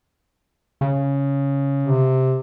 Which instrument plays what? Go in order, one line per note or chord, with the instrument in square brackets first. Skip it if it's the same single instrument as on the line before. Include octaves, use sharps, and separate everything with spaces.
[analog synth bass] C#3
[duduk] C3